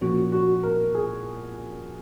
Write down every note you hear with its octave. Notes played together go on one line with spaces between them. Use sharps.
A#2 F3 A#3 C#4 F#4
F#4
A#4
G#4